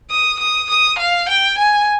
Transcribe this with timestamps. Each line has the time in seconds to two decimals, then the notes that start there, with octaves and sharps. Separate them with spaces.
0.10 D#6
0.40 D#6
0.70 D#6
0.98 F5
1.29 G5
1.58 G#5